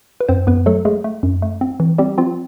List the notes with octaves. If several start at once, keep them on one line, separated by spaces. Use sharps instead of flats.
B4
F#2 C4 C5
F#2 B3 B4
F#3 A3 A4
G#3 A3 G#4
A3
F#2
A3
C4
E3
G3 C4 G4
F3 C4 F4